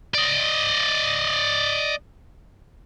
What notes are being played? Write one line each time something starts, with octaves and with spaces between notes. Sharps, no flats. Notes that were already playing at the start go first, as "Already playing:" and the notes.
D5 D#5